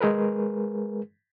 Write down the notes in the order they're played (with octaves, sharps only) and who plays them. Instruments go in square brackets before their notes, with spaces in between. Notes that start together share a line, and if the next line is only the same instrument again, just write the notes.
[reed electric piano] G#3 G#4 A#4 B4